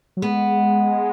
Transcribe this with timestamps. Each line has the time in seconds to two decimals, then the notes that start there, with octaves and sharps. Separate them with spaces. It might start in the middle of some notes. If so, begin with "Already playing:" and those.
0.17 F#3
0.22 G#3 B3